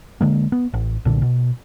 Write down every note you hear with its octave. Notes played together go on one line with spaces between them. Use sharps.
D3 G#3 A#3
B3
A1
B1 A#2 D3
B2